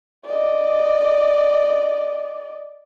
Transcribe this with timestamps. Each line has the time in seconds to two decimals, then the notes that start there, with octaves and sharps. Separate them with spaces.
0.25 D5 D#5